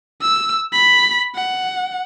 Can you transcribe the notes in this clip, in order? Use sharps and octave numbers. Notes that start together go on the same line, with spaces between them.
E6
B5
F#5